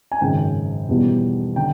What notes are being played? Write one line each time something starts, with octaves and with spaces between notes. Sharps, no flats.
G#5
G#1 F#2 C#3 G5
E2 B2 G3
D3 G5